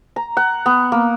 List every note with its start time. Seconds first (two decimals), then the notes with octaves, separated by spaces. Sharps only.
0.16 A#5
0.37 F#5
0.66 B3
0.92 A#3